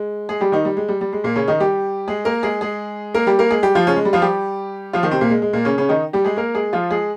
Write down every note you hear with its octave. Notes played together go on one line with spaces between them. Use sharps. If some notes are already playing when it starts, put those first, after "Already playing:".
Already playing: G#3
G#3 G#4
G3 G4
D#3 D#4
G3
G#3
G3
G3
G#3
A#2 A#3
C#3 C#4
D#3 D#4
G3 G4
G#3 G#4
A#3 A#4
G#3 G#4
G#3 G#4
A#3 A#4
G3 G4
A#3 A#4
G#3 G#4
G3 G4
F3 F4
C#3 C#4
G#3
G3
F3 F4
G3 G4
F3 F4
D#3 D#4
C3 C4
A#2 A#3
G#3
G#3
A#2 A#3
C#3 C#4
C#3 C#4
D#3 D#4
G3 G4
G#3 G#4
A#3 A#4
G#3 G#4
F3 F4
G#3 G#4